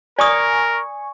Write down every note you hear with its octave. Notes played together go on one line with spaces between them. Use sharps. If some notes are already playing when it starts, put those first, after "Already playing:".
A#4 D5 G#5 C#6 D#6